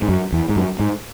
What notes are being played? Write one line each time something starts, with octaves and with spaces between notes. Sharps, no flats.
G#2
F#2
E2
G#2
F#2
G#2